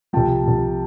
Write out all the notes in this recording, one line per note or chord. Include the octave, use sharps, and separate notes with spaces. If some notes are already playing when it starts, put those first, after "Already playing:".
C2 C3 F3 G5 A5
C2 C3 F3